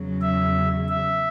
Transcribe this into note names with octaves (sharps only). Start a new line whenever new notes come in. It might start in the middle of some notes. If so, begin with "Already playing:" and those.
Already playing: E2 C#3 F#3
E5
E5